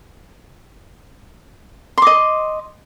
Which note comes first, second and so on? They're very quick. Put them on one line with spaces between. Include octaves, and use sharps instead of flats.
C6 D6 D#5